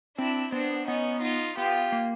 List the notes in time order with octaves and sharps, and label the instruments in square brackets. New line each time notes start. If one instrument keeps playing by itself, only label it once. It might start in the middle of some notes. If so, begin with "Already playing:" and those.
[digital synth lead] C4 [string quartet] D4 E4
[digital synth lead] B3 [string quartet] C4 D4
[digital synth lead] B3 [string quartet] C#4 D#4
[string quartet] D#4 F4
[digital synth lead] B3 [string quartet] F4 G4
[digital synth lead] A#3